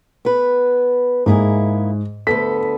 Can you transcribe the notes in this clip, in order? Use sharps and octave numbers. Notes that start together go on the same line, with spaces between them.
B3 B4
G#2 A#3 E4 G#4
D2 B3 A4 B6